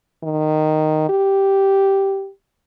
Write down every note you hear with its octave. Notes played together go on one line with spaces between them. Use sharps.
D#3
G4